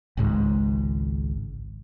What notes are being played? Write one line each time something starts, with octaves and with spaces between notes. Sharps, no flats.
G#1 C#2 G#2